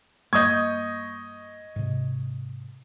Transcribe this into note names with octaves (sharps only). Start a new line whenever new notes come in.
G2 G3 A#3 D#5 C#6 D#6 G6 G#6
G#2 C3